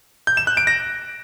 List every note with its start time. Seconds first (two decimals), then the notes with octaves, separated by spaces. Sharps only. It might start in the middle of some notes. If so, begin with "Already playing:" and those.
0.27 G6
0.37 E7
0.47 F#6
0.57 D7
0.67 A#6